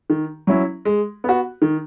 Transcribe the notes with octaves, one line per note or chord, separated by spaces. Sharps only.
D#3
F#3 C#4 E4
G#3
B3 F#4
D#3